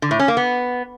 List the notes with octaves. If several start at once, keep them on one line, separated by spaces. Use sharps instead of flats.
D3
A2
C#4
A#3
B3